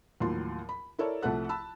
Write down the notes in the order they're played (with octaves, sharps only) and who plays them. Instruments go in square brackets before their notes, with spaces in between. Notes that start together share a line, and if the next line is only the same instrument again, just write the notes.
[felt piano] D#2 A2 F3 F#3 C6
B5
E4 A4 A#4 C#5 D5
C2 F3 A3 A4 F#5 F#6
A5 B5 E6